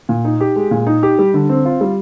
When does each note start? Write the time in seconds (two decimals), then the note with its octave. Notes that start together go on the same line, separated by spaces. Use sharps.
0.09 A#2
0.25 D#4
0.40 G4
0.56 G#3
0.71 A#2
0.87 D#4
1.03 G4
1.19 G3
1.34 D3
1.49 C4
1.65 F4
1.81 G3